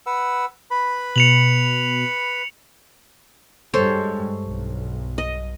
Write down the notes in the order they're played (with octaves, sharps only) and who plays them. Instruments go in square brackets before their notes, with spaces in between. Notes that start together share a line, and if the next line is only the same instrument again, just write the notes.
[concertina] B4 F#5 E6
B4 B5
[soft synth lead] B2 [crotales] C#7 F7 F#7
[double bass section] G2 G#3 [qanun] A4 C5 C#5
[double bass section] B1
[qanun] D#5